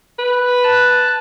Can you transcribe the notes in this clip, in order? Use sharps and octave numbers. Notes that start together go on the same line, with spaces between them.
B4
A5 F#6